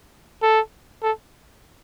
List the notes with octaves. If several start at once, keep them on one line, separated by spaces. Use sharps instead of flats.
A4
A4